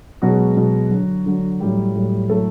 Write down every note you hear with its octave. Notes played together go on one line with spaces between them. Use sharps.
B2 F#3 G#3 F#4
B2 G#3
D3 F#3
D3 F#3
A2 F#3 G3 G4
A2 F#3
A2 F#3 A3 A4